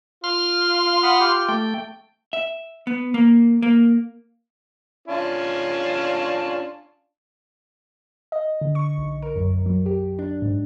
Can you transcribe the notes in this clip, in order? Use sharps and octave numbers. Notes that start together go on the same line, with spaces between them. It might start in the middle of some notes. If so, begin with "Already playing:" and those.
F4 C6 F6
F#5 B5 D#6
G4
A3 G5
E5
B3
A#3
A#3
C#4 D4 F4
D#5
D3
C#6
B1
A#4
F#2
F#3
G4
D4
G#2